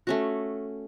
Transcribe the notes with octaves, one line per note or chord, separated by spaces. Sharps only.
A3 C#4 F#4